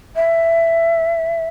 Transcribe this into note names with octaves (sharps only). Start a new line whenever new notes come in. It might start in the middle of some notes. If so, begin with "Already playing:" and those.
E5